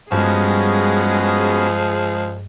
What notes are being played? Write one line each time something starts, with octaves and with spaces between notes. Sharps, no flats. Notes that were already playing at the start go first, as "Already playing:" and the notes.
G2 F3 G#3 B3 C#4 F#4 G#4